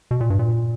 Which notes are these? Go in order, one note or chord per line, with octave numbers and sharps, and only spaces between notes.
B2
A#2
G2
A#2